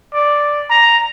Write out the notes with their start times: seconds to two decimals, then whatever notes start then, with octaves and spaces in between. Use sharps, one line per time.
0.13 D5
0.70 A#5